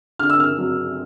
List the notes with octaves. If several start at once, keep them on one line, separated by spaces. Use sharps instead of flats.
D3 F6
E6
F6
F#3